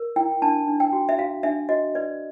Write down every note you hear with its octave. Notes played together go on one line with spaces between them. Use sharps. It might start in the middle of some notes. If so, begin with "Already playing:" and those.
Already playing: A#4
E4 G5
D4 A5
D4
G5
F#4
E5
F#4 F5
D4 E5
F#4 D#5
B4 D5